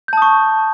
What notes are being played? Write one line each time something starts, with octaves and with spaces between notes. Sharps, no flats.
A5 C#6 D#6 G6